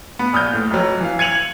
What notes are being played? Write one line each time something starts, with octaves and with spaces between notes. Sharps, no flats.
B3
A#1 D#6 F6 G6
A2
F2 F#3
E3 F5
G#6 C#7 D#7 F7 F#7